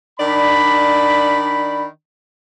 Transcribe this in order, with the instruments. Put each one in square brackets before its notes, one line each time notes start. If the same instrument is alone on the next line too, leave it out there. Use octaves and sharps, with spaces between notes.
[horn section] D#3 D4 D5 B5